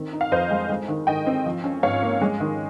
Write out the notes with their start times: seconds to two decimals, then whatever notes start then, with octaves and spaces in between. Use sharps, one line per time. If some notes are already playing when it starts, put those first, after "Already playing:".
Already playing: D#3 C4
0.13 D#4
0.21 F5
0.32 F2 C5 D#5
0.51 G#3
0.70 G#3
0.88 D#3
1.07 D#3 D#5 G5
1.27 C4
1.46 F3
1.64 C#4
1.83 G#2 C#5 F5
2.02 A#3
2.22 G#3
2.40 D#3